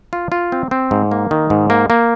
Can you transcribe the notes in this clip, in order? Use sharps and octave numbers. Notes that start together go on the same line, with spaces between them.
F4
F4
C4
C4
G#2
A#3
D#3
G#2
A#3
A#3